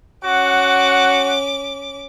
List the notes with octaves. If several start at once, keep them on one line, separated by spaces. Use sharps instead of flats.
C#4 F#4 F#5 D6